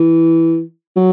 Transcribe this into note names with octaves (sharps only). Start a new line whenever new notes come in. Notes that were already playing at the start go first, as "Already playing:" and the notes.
Already playing: E3
F#3